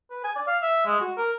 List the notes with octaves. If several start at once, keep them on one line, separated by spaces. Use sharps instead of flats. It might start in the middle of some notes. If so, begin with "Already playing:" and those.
B4
G#5
D5
F5
E5
G#3
F#4
A#4